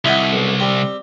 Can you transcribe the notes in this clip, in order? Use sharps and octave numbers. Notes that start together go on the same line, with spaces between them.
C2 E4 D#5 F#5
B1
G3 C4